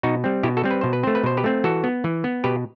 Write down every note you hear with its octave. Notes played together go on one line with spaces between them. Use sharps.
B2 D#4 F#4
G3 C4
B2 E4 G4
F#4 A4
G3 C4
B4
B2 C5
B4
A3 C4 C5
B4
B2 C5
G4 B4
A3 C4
E3 F#4 A4
B3
E3
B3
B2 G4 B4